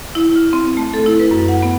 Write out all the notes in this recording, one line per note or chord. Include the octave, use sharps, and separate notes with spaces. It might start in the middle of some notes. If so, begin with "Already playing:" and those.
E4
F6
C4
A3
A4
E4
B4
F#2
F#5
B3